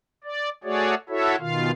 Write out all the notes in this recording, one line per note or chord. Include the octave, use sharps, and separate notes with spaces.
D5
A3 F#4 G#4 C#5 D5
E4 F#4 A4 C#5 E5
B2 D#3 F4 F5